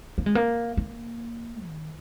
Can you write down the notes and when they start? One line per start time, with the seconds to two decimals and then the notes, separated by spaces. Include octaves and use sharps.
0.18 A#3
0.26 G#3
0.35 A#3
0.77 A#3
1.66 D#3